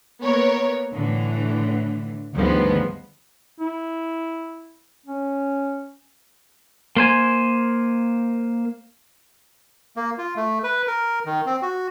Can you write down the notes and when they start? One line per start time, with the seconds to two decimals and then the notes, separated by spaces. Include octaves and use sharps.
0.23 A#3 B3 A#4 C#5
0.93 A2 D3 E3
2.33 D2 G2 D#3 F3 G#3 B3
3.60 E4
5.06 C#4
6.96 A#3 C5 G#5
9.97 A#3
10.18 F4
10.36 A3
10.64 B4
10.88 A#4
11.26 D#3
11.46 C4
11.62 F#4